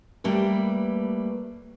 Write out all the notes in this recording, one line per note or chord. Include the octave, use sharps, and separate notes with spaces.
G3 A3 A#3 B4